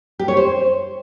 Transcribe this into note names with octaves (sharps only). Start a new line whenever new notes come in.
G4
C#5
C5